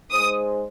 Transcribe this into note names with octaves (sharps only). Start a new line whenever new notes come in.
G#3 D#4 G#4 C5 D#6